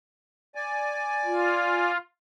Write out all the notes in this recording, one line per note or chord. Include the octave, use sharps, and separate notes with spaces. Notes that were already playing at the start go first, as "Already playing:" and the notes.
D5 G#5
F4